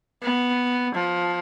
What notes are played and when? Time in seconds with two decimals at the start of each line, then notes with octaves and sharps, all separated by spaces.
0.23 B3
0.95 F3